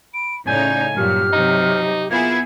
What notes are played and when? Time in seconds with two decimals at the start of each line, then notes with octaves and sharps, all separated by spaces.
0.14 B5 D7
0.47 A2 C#3 D#4 D5 G#5 G6
0.96 G2 A#2 F#3 G4 F6
1.33 C3 F#3 D#4
2.11 A#3 B3 E4 F4 G#4 G#6